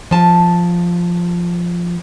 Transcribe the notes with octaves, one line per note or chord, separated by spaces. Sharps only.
F3 A5